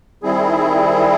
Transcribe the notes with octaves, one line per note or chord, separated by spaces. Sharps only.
D#3 G3 C4 E4 G#4